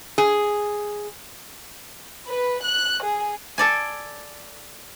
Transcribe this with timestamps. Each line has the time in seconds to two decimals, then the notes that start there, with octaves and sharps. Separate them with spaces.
0.18 G#4
2.28 B4
2.65 F#6
3.04 G#4
3.58 A4 D5 G#5